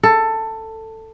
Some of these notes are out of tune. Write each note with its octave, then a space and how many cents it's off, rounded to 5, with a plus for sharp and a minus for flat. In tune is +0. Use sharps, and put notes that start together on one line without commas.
A4 +15